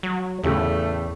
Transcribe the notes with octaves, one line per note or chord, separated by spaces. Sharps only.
F#3
E2 A2 C#3 A3 G4